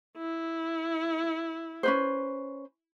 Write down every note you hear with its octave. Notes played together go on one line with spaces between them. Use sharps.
E4
C#4 B4 C5